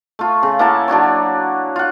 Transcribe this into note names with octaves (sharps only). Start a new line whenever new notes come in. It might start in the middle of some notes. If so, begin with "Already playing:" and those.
A3 F4
C#3
A#3 E4 F#5 A5
F#3 D4 F#4 C#5
F4 F#5